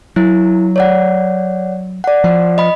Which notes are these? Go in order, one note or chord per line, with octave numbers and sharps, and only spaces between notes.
F#3 E4
C#5 D5 F#5
D5 F#5
F3
D#5 B5